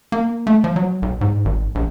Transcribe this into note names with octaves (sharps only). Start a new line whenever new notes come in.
A#3
A3
F3
F#3
B1
G#2
G#1
A#1